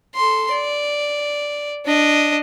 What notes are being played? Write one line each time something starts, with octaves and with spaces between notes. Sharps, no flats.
A4 C6
D5
D4 D#5